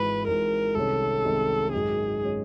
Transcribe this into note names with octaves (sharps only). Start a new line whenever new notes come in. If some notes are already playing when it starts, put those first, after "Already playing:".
Already playing: G#1 G#2 E3 G#3 B4
G#1 G#2 E3 G#3 A#4
C2 C3 D#3 G#3 C#4 A4
C2 C3 D#3 G#3 C#4
G#1 F#2 D#3 G#3 C#4 G#4
D#3 G#3 C#4